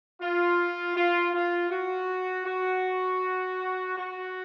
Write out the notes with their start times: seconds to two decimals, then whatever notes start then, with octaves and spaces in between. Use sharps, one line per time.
0.21 F4
0.96 F4
1.34 F4
1.71 F#4
2.46 F#4
3.97 F#4